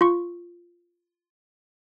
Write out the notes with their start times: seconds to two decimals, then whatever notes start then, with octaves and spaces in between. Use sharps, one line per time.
0.01 F4 C#6